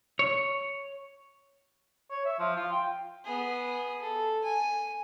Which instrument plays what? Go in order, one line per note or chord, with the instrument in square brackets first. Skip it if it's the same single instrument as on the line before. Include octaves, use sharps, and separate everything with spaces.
[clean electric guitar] C#5
[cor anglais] C#5
E5
F3
F4
G5
[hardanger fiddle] B3 G#4
A4
G#5